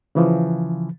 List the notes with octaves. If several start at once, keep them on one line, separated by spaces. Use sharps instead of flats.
C#3 E3 F3